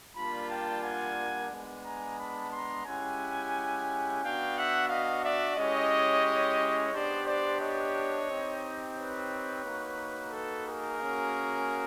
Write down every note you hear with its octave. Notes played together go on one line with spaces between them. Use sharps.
G3 A#3 D4 F4 A5 B5
G5 A5
F#5 G#5
G#3 B3 D4
G#5 A#5
A5 B5
A#5 C6
G#3 C#4 E4 G4 F#5 G#5
B3 D4 F#4 F5 G5
E5 F#5
D#5 F5
D5 E5
G#3 C#4 E4 G4 C#5 D#5
B3 D4 G4 C5 D5
C5 D5
C#5 D#5
C4 D#4 G4
B4 C#5
A#3 D#4 F#4
A4 B4
G#4 A#4
A#3 C#4 F#4